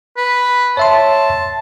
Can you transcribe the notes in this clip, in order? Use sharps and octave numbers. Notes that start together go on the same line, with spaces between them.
B4
C#5 E5 A5 C6